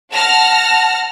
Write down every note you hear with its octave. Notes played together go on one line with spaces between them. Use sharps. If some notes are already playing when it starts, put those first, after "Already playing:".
F#5 A5 F6 A#6